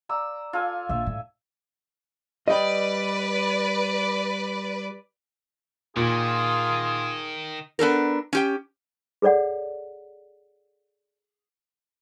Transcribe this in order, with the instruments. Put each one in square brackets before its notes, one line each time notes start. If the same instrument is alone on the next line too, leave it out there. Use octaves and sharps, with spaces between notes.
[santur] D5 A#5 E6
F4 A4 G#5
[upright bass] A#1 A#3 [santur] E5
[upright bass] A2
[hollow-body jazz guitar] G3 D#5 [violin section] B4 D5
[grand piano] A#2 [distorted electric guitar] D#3 [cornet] F4 [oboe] G#4
[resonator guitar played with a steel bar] B3 D4 A4 A#4
C#4 G4 G5
[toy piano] G#4 A4 C#5 D5 F#5